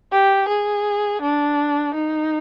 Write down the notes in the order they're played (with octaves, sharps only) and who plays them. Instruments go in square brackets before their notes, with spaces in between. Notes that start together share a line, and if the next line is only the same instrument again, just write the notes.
[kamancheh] G4
G#4
D4
D#4